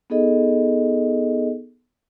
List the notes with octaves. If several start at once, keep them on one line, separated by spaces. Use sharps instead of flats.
B3 D#4 G#4 A4 D#5